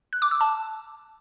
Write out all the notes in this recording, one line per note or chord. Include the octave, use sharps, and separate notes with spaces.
F#6
D6
E6
A5